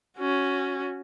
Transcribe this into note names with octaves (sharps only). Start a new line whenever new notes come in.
C#4 F#4